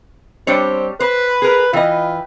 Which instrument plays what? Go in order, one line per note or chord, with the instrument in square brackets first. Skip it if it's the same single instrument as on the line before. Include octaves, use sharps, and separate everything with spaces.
[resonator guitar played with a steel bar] G3 D4 C#5 [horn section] C4
[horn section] B4 [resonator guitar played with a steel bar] C5
[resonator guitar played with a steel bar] G#4 A#4
[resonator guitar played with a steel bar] E3 D#5 [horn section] F4 B4 G5